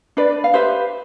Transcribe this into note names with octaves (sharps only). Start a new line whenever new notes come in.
D4 B4 D5
F5
G4 B4 C5 E5